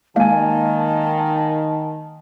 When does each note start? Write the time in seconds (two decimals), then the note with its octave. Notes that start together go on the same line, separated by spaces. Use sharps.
0.16 D#3 G#3 A#3 F5 G#5 A5